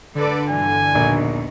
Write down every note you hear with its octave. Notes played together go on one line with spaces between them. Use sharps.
D3 A4 B4 D5
G2 B2 E3 G#5
A#1 D#2 B2 D#3